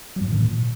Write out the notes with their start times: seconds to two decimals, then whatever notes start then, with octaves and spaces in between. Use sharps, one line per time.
0.16 F#3
0.21 G2
0.27 A2
0.32 D#3
0.37 A#2